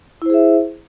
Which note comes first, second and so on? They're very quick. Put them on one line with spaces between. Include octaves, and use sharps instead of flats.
E4 C5 G#4 E5